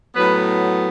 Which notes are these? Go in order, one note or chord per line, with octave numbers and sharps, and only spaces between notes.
A2 F#3 B3 B4